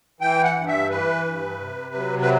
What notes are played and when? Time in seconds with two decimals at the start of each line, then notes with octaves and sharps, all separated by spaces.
0.21 E3 G5
0.44 F#5
0.56 G2
0.67 E5
0.90 E3 B4
1.26 G2
1.59 C3
1.95 F#3
2.21 B4